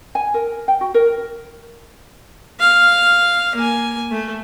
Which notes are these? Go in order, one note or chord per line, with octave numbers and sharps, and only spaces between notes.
G#5
A#4
G5
F#4
A#4
F5
A#3 G#5
A3